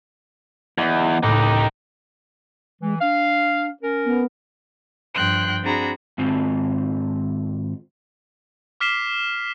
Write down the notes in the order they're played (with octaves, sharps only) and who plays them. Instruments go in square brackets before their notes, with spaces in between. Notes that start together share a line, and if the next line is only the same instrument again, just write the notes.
[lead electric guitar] E2 [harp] D#5 B6
[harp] C#2 A2 [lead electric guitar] D#4 G4
[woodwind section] E3 [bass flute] G#3
[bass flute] D4 [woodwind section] F5
[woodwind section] C#4 A#4
[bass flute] B3
[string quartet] G2 F3 G5 C6 F#6
C4 D4 F#4 G#4 A#5 B5
[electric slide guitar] G#2 D#3 C4 F4
[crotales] D6 F6 B6 C7 E7 G7